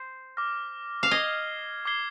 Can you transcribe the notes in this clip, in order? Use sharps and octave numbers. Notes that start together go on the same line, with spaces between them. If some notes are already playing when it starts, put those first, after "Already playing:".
Already playing: C5
D6 F6 A#6
F5
D#5 D6 G#6 C7 G7
D6 G#6 C7 G7